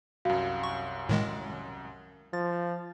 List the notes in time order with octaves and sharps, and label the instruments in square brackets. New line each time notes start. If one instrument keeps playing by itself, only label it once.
[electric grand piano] C2 F#2 [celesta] F#4 F5
[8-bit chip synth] C#6
A2 D#3 G#3
[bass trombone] F3 [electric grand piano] A6